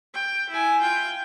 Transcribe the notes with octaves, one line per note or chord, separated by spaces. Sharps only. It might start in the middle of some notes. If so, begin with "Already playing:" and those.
G5
E4 G#5
F4 G5